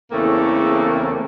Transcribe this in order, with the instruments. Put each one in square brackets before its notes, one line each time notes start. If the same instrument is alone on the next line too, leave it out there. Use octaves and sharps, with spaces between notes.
[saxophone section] E2 A2 C#3 A3 A#3 C4